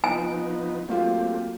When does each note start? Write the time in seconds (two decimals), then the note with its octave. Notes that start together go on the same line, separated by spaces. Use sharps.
0.04 F3 B3 D#4 G#5
0.89 F#3 A3 A#3 C4 F4 G4